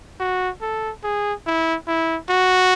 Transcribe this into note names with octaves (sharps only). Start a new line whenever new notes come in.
F#4
A4
G#4
E4
E4
F#4